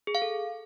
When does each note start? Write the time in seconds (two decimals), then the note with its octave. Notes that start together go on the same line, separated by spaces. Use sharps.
0.07 G#4
0.15 F5
0.22 A4